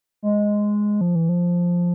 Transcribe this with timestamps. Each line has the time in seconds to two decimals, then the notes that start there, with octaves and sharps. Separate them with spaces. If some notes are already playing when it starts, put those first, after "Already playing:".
0.23 G#3
1.01 F3
1.15 E3
1.29 F3